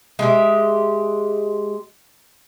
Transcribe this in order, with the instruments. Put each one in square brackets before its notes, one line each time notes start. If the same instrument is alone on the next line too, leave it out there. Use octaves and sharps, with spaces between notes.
[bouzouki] G#3 G4 E5